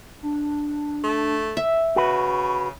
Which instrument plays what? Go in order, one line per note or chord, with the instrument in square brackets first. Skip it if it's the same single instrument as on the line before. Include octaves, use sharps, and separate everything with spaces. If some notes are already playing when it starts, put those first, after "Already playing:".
[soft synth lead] D4
[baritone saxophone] A3
[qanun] E5
[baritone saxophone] C#3 [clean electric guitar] F#4 B4 [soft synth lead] C#6